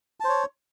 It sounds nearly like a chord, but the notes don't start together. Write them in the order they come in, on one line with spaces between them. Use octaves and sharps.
A5 C5 C#5